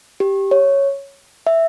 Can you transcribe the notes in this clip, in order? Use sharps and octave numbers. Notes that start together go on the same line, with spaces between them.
G4
C#5
E5